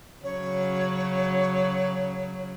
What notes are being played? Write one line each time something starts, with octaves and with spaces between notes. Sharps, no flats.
C#3 F#3 C#5